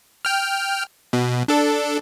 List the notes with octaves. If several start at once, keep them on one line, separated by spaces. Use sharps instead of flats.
G5 F6
B2
D4 A4